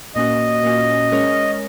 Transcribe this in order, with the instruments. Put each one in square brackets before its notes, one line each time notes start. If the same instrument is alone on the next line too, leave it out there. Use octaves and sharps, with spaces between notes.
[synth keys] A#2 A#3 C#4 F#4 [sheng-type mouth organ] D#5
[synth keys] A#2 A#3 C#4 F#4
G#3 C#4 A#4 C#5